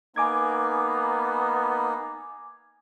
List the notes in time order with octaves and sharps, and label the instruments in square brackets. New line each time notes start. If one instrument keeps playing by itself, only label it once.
[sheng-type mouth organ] A#3 D#4 [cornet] B3 [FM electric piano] G#5 D6 G#6